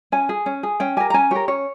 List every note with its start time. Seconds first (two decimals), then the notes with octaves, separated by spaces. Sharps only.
0.12 C#4 G#5
0.29 G#4
0.46 C#4
0.63 G#4
0.80 C#4 G5
0.97 G4 A#4 G#5
1.10 A#5
1.14 C#4 G#5
1.31 G4 A#4 C#5
1.48 C#4 C#5